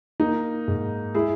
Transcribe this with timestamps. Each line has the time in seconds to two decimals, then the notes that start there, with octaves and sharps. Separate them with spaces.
0.20 A#3 D#4
0.68 G#2
1.14 G#3 E4 G#4